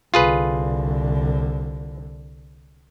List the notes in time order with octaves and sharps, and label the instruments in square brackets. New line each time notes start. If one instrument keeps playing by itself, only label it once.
[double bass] C2 D3 [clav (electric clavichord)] F4 G#4 B4